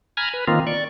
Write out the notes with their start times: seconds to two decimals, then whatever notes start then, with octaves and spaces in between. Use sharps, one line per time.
0.17 G#5 A#5 B5 F6 G#6
0.34 B4
0.48 D#3 A#3 C4 F4
0.67 D5 C#6